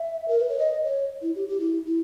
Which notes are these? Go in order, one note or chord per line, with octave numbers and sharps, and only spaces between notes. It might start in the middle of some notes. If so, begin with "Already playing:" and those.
Already playing: E5
A#4
B4
C#5
D#5
C#5
E4
G4
G4
E4
E4